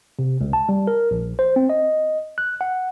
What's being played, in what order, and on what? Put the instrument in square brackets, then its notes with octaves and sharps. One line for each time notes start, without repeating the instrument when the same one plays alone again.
[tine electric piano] C3
C#2
A5
G3
A#4
A#1
C5
C4
D#5
F#6
F#5